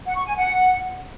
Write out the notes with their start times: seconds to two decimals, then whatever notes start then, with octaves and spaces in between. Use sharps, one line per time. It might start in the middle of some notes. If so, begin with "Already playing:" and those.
0.06 F#5
0.16 C#6
0.26 G#5
0.37 F#5